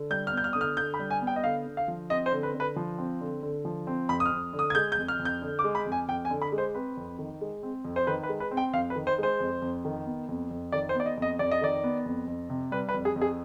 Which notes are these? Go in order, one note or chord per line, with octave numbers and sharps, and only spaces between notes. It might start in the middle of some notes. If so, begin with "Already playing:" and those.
Already playing: D3
G3 G6
F6
B3 G6
F6
D3 D#6
F6
D3 G6
B5
G3
G#5
B3
G5
D#5
D3 F5
D3
F5
F3
C4 D#5
C5
D3
B4
D3
B4
F3
C4
D3
D3
F3
C4
F2 B5
D#6
F6
F2
D3
D#6
G#6
G#3 G6
G6
F2
F6
F2
G6
D3
D6
G#3
B5
F2
G#5
F2 G5
G#5
D3
B5
G#3
C5
C4 B4
F2
D#3
G#3
C4
F2
C5
D#3 B4
B4
G#3
B4
C4
G5
F2 F5
B4
D#3
C5
G#3 C5
F2
F2
D#3
B3
F2
F2
D#3 D5
C5
B3
D5
D#5
F2 D#5
F2 D5
D#5
D#3 D5
B3
F2
F2
C3
G3 B4
B4
F2
G#4
F2
G#4